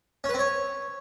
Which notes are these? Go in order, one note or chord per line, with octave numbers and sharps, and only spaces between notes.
C#4
B4
C4
C#5